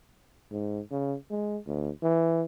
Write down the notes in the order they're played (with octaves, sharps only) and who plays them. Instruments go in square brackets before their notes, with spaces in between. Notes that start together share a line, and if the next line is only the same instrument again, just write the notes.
[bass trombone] G#2
C#3
G#3
D2
E3